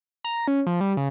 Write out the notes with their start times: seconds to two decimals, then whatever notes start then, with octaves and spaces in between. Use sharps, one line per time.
0.24 A#5
0.48 C#4
0.67 F3
0.81 G3
0.97 C#3